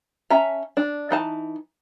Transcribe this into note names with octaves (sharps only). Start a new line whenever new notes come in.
C#4 E5 A5 A#5
D4
E3 D#4 A5